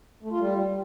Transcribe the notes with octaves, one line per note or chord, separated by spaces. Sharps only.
A3
F4
G3